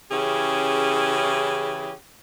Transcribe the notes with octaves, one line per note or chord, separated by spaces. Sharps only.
C#3 E3 C#4 E4 G4 G#4